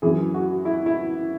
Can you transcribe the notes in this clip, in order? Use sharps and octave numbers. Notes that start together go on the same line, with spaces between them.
F#2 E3 G#4
F#4
E4
E4